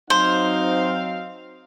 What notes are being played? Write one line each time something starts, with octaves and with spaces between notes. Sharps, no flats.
F#3 C4 D#4 C5 F5